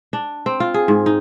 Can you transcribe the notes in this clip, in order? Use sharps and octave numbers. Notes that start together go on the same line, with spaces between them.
D4
C4
F4
G#4
G#2
D#4